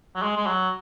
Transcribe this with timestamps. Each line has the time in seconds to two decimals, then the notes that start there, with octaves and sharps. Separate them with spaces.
0.16 F#3
0.23 G#3
0.37 G#3
0.47 F#3